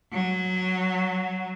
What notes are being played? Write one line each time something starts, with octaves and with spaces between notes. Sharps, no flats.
F#3